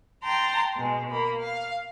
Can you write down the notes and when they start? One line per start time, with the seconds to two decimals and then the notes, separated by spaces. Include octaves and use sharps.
0.23 G5 A5 A#5 C6
0.77 B2 G#3
1.11 A#3 B5
1.40 F5